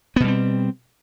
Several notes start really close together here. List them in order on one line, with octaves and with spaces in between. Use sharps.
B3 B2 G3 C4